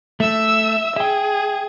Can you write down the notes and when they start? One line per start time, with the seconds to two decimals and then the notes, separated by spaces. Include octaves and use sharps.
0.20 A3 E5 E6
0.96 G#4 E5 G5